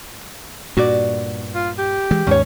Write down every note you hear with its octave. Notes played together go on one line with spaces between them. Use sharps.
G2 A#2 F#4 D5
F4
G4
E3 G#3
D#2 G#2 C#4 C#5